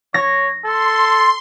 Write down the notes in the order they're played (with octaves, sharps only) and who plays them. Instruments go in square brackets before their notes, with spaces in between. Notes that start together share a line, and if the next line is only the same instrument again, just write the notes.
[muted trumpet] C#5 [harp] A#6
[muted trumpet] A4 [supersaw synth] C6